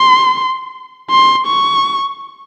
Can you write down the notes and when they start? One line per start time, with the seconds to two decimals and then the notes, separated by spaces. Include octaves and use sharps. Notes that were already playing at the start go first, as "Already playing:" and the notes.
Already playing: C6
1.10 C6
1.47 C#6